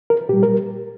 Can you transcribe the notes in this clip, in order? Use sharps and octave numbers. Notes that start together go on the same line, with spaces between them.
A#4
A#2 G3 G4
A#4